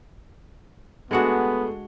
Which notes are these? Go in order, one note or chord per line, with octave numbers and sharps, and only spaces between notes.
G#3 A3 B3 D4 F#4 G#4 C#7